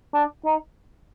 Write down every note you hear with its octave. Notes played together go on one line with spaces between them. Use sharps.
D4
D#4